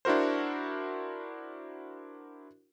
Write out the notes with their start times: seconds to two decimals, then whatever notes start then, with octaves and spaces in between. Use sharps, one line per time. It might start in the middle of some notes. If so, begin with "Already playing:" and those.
0.05 D4 E4 F#4 A#4 C5